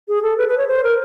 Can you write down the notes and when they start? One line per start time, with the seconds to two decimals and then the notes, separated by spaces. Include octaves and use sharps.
0.08 G#4
0.22 A4
0.38 B4
0.48 B4
0.58 C#5
0.68 C5
0.84 A#4